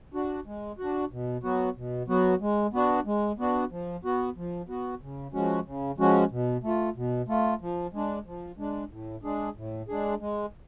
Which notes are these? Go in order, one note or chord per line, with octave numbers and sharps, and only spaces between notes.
D4 F#4
G#3
D4 F#4
B2
F#3 B3 F#4
B2
F#3 B3 F#4
G#3
B3 D4 F#4
G#3
B3 D4 F#4
F3
B3 F#4
F3
B3 F#4
C#3
F3 G#3 C#4 F#4
C#3
F3 G#3 C#4 F#4
B2
A3 F4
B2
A3 F4
F3
G#3 D4
F3
G#3 D4
A2
G#3 D4 G#4
A2
G#3 D4 G#4
G#3